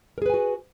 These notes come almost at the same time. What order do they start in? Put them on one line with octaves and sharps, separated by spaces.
A#4 G#4 B4 G#5 F#4